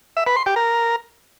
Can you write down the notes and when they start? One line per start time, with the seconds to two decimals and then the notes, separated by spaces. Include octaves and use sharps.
0.17 E5
0.26 B4
0.36 C6
0.46 G4
0.56 A#4